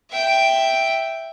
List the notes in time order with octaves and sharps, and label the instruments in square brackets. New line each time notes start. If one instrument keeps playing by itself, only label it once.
[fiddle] E5 G5